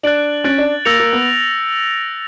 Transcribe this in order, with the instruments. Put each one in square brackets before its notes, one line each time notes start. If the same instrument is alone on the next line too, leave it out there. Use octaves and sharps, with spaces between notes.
[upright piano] D4 [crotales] F#6 A6 D7 F#7
[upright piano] C#4 [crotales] F#6 A6 D7 F#7
[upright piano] D4
[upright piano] A#3 [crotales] E6 G6 A#6 C#7 F7
[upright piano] A#3
B3